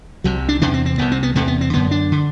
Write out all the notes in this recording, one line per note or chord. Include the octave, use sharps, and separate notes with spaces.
C2 C3 F#3
D4
E2 C3 D4
C4
C4
C2 C3 B3
C4
B3
E2 C3 A3
B3
C4
F#2 D3 B3
D4
D3